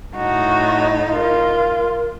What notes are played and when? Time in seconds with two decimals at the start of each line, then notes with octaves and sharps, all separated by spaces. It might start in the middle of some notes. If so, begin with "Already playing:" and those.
0.17 A2 D#4 F#4
1.12 F4 A#4